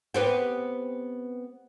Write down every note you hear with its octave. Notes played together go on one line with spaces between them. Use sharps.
B3 C4 G4